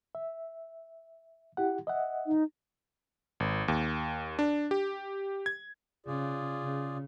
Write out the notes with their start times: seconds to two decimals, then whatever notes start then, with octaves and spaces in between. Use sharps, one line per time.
0.15 E5
1.57 E4 G4 F#5
1.87 D#5 E5 F#5
2.27 D#4
3.40 G#1
3.68 D#2
4.39 D4
4.71 G4
5.46 G#6
6.06 C#3 F4 G#4 D5
6.62 C#3